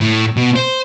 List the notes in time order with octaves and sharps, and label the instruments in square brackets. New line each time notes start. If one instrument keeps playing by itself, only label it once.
[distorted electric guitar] A2
B2
C5